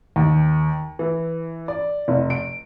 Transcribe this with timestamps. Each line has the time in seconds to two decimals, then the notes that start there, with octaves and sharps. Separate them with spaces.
0.16 D#2
0.99 E3
1.68 D5
2.08 F1
2.30 D7